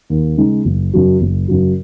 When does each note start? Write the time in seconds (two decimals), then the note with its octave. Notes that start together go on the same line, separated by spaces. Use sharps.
0.10 D#2
0.37 C#3 G#3 D#4
0.65 F#1
0.93 F#2 C#3 F#3
1.21 F#1
1.48 F#2 C#3 F#3